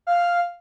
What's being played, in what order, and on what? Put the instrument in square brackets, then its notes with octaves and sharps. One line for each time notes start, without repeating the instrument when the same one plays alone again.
[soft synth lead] F5